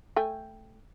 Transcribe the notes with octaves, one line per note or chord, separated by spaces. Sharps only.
A3 G5 G#5